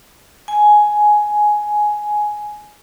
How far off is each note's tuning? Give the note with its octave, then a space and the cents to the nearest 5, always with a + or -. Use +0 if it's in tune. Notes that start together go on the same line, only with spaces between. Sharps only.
G#5 +10